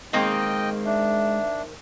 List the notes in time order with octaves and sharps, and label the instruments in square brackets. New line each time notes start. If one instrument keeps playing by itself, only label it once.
[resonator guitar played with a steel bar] D#3 A#3 C4 [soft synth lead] G#3 [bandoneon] D#5 G5
[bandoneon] D4 [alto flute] E5